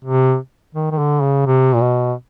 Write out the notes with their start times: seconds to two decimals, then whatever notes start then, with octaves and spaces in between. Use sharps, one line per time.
0.05 C3
0.75 D#3
0.91 D#3
0.98 D3
1.22 C#3
1.46 C3
1.74 A#2
1.82 B2